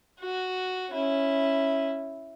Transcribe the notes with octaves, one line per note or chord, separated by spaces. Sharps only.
F#4
C#4 E4